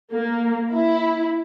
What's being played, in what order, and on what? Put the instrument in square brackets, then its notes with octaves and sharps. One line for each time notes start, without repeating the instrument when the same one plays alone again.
[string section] A#3
E4